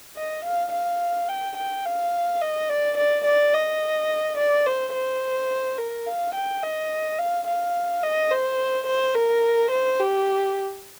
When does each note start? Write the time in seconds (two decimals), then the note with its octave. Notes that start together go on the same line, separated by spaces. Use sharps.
0.16 D#5
0.45 F5
0.72 F5
1.29 G5
1.57 G5
1.85 F5
2.41 D#5
2.69 D5
2.97 D5
3.25 D5
3.53 D#5
4.37 D5
4.66 C5
4.94 C5
5.78 A#4
6.06 F5
6.34 G5
6.63 D#5
7.19 F5
7.47 F5
8.03 D#5
8.31 C5
8.87 C5
9.14 A#4
9.71 C5
10.00 G4